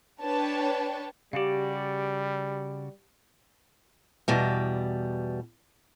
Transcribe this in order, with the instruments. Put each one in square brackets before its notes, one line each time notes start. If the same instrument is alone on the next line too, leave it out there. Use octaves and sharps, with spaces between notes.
[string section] D4 B4 C#5 G5 A5
[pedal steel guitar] C#3 F#4 D5 [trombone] G3 [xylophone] G4 F5
[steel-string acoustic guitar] E2 B2 G3